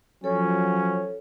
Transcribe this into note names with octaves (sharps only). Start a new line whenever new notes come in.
F3 F#3 C#4 A4 C#5